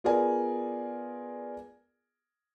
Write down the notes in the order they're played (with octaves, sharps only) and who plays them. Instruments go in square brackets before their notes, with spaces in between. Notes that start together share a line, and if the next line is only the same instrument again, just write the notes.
[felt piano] B3 F4 G#4 A#4 D5 G#5